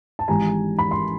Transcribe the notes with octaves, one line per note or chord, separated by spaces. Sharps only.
A5
G#1 G#2 E3 G3 G#5 A#5
B5
C6